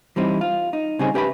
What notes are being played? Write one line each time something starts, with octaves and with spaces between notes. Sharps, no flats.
E3 G3 C4 D#4 E4
F4
D#4
C#3 G3 C4 D#4 G#4
C#4 G4 B4 E5 B5